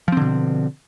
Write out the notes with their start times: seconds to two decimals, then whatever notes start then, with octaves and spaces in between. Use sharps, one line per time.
0.08 F3
0.12 C4
0.17 D3
0.21 B2